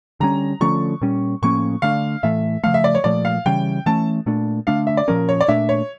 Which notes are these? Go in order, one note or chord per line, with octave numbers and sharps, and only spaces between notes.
D3 G3 C#4 A#5
D3 F3 A3 C#4 C#6
A#2 G3 C#4
A2 F3 A#3 C#4 C#6
D3 A3 D4 F5
A2 E3 A3 E5
C#3 F3 A3 F5
E5
D5
C#5
A#2 F3 A3 D5
F5
C#3 E3 G3 C#4 G5
E3 A3 C#4 A5
A#2 A3 D4
D3 A3 D4 F5
E5
D5
A#2 F3 C#4 A#4
C#5
D5
A#2 A3 D4 E5
C#5